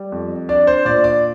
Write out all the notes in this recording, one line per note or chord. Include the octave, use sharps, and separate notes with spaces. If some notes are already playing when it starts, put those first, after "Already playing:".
Already playing: G3
F2
D4 D5
C5
A#2 D5
D5